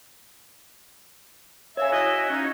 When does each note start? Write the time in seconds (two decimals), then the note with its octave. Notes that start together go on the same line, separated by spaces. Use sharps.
1.77 C#5 E5 F5 G#5
1.92 E4 F#4 D#5
2.07 D#5
2.30 C#4 D#4